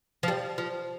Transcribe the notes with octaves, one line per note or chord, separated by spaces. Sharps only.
F3
G3
F3